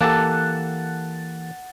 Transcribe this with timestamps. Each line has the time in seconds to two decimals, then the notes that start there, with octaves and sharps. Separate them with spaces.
0.01 E3 A#3 G4 A4 F#5 A5